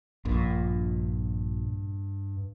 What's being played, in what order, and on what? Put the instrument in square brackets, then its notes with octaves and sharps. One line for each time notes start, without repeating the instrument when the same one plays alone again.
[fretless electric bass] A#1 A#2 [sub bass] G2